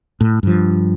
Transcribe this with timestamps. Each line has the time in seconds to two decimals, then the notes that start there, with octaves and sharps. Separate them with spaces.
0.21 A2
0.43 G2 F3